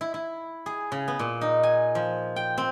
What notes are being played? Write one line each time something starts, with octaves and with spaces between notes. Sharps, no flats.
E4
E4
G#4
C#3
B3
A#2
D#4
G#5
F3
G5
C4